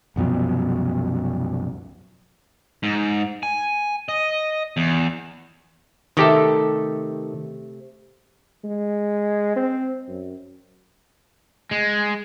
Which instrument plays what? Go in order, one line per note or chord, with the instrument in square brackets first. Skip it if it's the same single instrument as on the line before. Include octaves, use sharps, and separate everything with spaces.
[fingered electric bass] C2 F#2 B2 F3
[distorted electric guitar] G#2
G#5
D#5
E2
[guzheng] C3 A3 [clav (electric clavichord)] D#3 G4 A4
[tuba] G#3
C4
F#2
[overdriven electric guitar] G#3